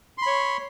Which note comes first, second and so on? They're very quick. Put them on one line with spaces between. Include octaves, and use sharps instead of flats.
C6 B5 C#5